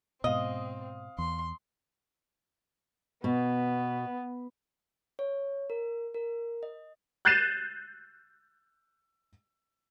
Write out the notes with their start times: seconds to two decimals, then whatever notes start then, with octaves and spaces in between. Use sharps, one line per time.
0.24 G#2 B2 C4 D#5 F5 D#6
1.18 E2 C6
3.24 B2 B3
5.19 C#5
5.70 A#4
6.14 A#4
6.63 D#5
7.25 F#6 G6 A6 C7 D#7 E7